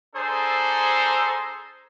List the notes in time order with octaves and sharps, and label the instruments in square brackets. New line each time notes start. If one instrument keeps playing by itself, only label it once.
[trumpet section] D4 G#4 A4 C5 A#5